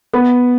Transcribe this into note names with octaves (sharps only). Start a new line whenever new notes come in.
B3